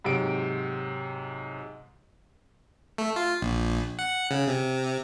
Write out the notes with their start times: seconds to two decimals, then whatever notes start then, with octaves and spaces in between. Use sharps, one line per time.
0.04 G#2 C3 F#3 D7
2.98 A3
3.16 F4
3.42 A#1
3.99 F#5
4.31 C#3
4.47 C3